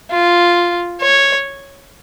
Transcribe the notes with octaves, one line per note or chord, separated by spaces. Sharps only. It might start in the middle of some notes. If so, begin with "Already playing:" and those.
F4
C#5